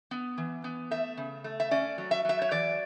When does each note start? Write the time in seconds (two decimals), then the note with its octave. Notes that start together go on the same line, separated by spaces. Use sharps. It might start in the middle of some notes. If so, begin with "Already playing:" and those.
0.11 B3
0.38 E3
0.64 B3
0.91 A3 E5
1.17 C#3
1.44 A3
1.60 E5
1.71 C#4 D5
1.98 F#3
2.11 E5
2.25 F#3 E5
2.42 C#5
2.51 E3 D5